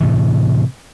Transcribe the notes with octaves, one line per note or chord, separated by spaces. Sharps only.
A2 C3 E3